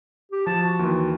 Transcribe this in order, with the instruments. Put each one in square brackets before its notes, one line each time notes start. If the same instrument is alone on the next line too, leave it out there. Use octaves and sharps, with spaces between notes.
[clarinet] G4
[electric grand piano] F3 [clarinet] A5
[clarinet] F#4
[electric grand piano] D#2 E3